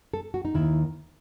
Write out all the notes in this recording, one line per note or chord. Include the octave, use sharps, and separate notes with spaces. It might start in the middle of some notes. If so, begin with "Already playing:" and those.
A4
F#4
D#4
D#2 D#3 E4